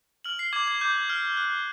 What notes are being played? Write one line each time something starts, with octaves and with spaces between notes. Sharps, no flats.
F6 F#7
C7
D6 G#6
G#6
D6 G6
F6
F#6